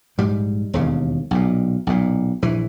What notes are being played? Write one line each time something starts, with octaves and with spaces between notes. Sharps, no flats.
A#1 G#2 G3
E1 D#2 C#3
B1 A#2
B1 A#2
A#1 E3